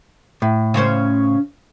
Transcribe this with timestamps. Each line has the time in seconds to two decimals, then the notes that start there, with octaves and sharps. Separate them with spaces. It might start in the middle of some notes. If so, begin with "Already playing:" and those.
0.42 A2
0.74 C#3 C#4 C5